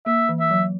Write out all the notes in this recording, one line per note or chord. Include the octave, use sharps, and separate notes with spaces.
A#3 E5
E3
E5
F#3